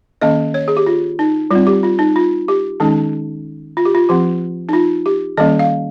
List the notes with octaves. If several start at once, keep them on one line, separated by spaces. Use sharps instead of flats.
D#3 A#3 C#4 D#5
C#5
G#4
G4
F4
D#4
G3 C4 F4
G4
F4
D#4
F4
G4
D#3 G#3 C#4 D#4
F4
G4
F4
F3 C4 G4
D#4
F4
G4
D#3 G3 A#3 C#4 D#5
F5